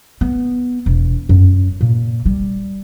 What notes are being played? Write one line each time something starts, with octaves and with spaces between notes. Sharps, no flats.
B3
E1
F#2
A#2
G3